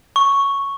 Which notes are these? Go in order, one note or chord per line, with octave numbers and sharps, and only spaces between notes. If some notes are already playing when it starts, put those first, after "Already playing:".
C#6